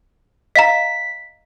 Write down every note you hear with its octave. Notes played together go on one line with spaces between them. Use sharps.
D#5 F5 A#5 B6